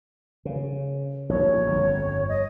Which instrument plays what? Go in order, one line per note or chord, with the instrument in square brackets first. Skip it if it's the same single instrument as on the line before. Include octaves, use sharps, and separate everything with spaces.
[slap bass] C#3
[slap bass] A#1 [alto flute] C#5
[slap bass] G1 F2
[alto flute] D#5